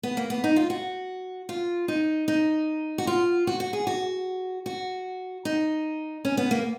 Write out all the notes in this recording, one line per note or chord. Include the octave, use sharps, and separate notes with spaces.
B3
A#3
B3
D#4
F4
F#4
F4
D#4
D#4
F#4
F4
F#4
F#4
G#4
F#4
F#4
D#4
C#4
B3
A#3